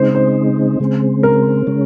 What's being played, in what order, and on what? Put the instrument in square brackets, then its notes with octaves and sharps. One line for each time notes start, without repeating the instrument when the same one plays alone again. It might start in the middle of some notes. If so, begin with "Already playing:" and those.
Already playing: [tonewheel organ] C#3 G#3 C4 D#4 [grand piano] C5
[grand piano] C5
[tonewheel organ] C#3 G#3 C4
[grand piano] A#4
[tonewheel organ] C#3 G#3 C#4